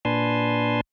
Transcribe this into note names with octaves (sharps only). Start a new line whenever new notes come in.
A#2 D4 B4 G#5 A5 C6